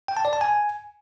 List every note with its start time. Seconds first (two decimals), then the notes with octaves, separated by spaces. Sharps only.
0.08 G5
0.17 A5
0.25 D5
0.33 A5
0.41 G#5